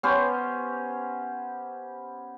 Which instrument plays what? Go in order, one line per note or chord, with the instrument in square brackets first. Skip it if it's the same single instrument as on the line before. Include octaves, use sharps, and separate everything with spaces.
[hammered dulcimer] B3 C#4 G4 C5